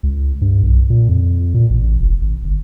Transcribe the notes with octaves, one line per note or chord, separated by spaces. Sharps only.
C#2
G2
B1
A#2
F2
A#2
A1
E1
G#1
G1